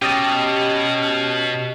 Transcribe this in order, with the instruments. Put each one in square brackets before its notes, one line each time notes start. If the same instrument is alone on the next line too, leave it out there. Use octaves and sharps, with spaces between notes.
[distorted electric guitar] B2 [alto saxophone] C#4 [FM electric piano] G4 D#5 A5